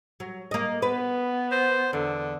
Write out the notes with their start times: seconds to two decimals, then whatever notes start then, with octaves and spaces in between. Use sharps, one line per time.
0.20 F#3
0.51 A#3 D#5
0.82 B3 B4
1.52 C5
1.93 E2 D3